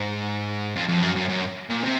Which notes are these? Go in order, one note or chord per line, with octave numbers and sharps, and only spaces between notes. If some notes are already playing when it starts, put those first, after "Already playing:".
Already playing: G#2
F2
F2
F#2
F#2
F#2
A#2
C3